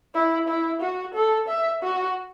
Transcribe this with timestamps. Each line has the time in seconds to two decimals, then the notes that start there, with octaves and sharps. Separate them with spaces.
0.15 E4
0.48 E4
0.82 F#4
1.15 A4
1.48 E5
1.83 F#4